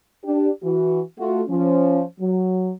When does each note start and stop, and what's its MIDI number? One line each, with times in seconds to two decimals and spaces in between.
0.24 0.49 62
0.24 0.49 67
0.63 1.00 52
0.63 1.00 66
1.18 1.42 57
1.18 1.42 65
1.18 1.42 66
1.48 2.02 53
1.48 2.02 61
2.20 2.71 54